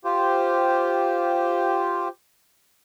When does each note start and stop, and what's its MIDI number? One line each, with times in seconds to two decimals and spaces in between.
0.05 2.08 65
0.05 2.08 67
0.05 2.08 72